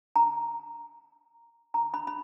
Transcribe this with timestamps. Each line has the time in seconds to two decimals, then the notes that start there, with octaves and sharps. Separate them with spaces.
0.16 A#5
1.74 A#5
1.94 B5
2.07 B5